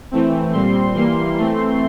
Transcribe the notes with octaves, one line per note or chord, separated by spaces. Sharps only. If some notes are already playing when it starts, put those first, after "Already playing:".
E3 A3 C4
A#2 G3 C4 C6
E3 G3 A#3 C6
E3 A3 C4